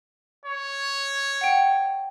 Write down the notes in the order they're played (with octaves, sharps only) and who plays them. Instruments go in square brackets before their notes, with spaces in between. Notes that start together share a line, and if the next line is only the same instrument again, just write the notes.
[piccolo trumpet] C#5
[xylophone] F#5 G5